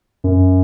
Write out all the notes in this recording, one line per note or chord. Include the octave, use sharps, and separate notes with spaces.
F#2